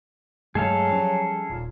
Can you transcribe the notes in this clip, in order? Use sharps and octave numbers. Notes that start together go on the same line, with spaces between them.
G2 F#3 G#3 A3 G#4 A4 F5
F3 G3 C#4
D#1 A#2